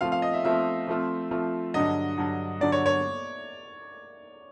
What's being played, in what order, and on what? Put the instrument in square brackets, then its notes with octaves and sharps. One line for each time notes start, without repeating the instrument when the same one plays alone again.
[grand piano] F3 A3 C4 F4 [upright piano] F5
[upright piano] F5
D#5
E5
[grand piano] F3 A3 C4 F4 [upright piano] E5
[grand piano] F3 A3 C4 F4
F3 A3 C4 F4
[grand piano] G2 D3 F#3 [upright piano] D#5
[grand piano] G2 D3 F#3
[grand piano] G2 D3 F#3 [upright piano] D5
[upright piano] C#5
C#5